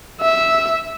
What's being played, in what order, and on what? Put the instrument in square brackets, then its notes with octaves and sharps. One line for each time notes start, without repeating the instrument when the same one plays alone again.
[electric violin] E5